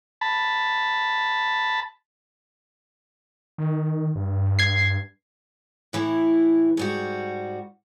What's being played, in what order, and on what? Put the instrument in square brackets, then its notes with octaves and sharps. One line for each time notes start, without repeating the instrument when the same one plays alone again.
[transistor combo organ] A5 B5
[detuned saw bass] D#3
G2
[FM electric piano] G#6 C7
[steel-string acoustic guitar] A2 E3 E4
G#2 G3 F#4